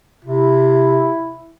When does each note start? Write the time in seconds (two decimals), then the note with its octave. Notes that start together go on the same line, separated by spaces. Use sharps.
0.25 C3 E4